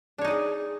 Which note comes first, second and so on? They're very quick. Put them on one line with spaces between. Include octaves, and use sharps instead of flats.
D4 C#5 D#4 D5 G#4